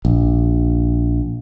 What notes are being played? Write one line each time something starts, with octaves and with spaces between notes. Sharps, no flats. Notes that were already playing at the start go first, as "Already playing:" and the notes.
A#1